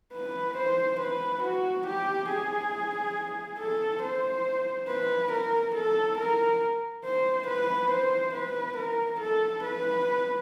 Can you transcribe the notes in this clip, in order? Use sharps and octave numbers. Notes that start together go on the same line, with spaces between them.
B4
C5
B4
F#4
G4
G#4
A4
C5
B4
A#4
A4
A#4
C5
B4
C5
B4
A#4
A4
B4